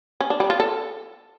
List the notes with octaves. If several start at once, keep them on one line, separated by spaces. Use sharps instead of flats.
C#4
D4
G3
F4
A4